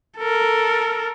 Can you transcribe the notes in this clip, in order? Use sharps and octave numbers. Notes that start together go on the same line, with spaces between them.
A4 A#4